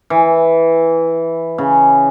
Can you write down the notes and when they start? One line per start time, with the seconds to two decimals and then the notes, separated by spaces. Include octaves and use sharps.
0.10 E3
1.58 C#3